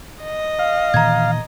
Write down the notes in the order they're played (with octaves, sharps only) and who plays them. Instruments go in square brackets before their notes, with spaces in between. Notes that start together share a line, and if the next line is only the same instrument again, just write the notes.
[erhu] D#5
[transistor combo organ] F5
[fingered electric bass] A#2 D#3 E3 [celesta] A#5 G#6